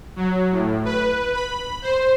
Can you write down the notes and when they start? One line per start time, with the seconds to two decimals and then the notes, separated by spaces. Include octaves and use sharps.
0.16 F#3
0.51 A2
0.85 B4
1.33 B5
1.82 C5